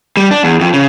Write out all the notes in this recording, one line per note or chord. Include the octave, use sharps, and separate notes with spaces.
G3
D4
E2
F2
C#3